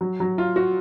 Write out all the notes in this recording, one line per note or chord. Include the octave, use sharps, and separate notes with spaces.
F#3
F#3
F4
F#4